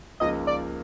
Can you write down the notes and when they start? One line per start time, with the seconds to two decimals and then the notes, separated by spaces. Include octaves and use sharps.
0.20 C#2 C#3 F3 A#3 D#4 D#5
0.47 D5